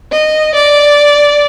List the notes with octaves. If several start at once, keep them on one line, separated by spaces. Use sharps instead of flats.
D#5
D5